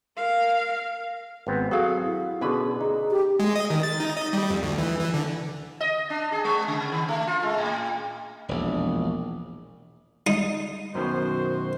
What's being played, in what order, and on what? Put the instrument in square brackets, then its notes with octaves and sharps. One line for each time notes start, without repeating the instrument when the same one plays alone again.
[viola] A#4 F5
[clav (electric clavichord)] G#1 B3 C4
[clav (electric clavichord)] F#3 [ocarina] C4 [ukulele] G#4 A4 F5
[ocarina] E4
[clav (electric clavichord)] B2 D3 [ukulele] C#4 B4 [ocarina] G#4
[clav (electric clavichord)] D#4 [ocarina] G#4
[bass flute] G4
[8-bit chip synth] G#3
D#5
D#3
A6
D#4
D#5
G3
F2
D2
E3
E3
D3
[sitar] D#5
D4
G#4
G#3
C#3
D#3
A3
F4
G#3
A2
[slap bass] E1 A#1
[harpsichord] D#4
[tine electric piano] F#2 B2 D#3 [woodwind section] F#4 C5